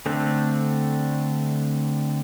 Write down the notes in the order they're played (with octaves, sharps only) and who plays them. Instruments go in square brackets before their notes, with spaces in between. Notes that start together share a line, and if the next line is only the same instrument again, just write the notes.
[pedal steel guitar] D3 A3 C4 D4